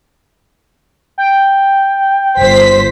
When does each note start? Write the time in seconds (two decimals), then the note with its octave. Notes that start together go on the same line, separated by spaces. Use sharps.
1.18 G5
2.38 G1 C5 B6